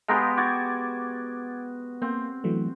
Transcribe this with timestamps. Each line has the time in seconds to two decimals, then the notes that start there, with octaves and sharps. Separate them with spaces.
0.08 G#3 B3 G4 F5 A#5 C6
0.37 F#4 D6 G#6 A6
2.02 A#3 C4
2.44 E3 F#3 A3